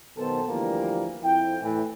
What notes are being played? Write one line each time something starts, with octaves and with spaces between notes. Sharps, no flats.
B1 D#3 B3 A4 C5 A5
D2 E3 F3 G3 A#3
F2 E4 G5
A2 E3